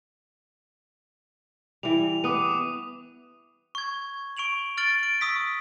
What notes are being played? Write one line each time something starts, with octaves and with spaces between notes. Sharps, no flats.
E3 G3 F7
B3 D6 D#6 D#7
C#6 G#6
C#6 D7 F7 F#7
F6 A6 D7 F#7 G7
D7
C#6 D#6 E6 B6